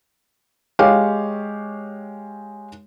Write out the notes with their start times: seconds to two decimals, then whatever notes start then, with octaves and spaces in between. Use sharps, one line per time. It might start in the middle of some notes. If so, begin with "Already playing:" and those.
0.79 G#3 G4 C#5 F5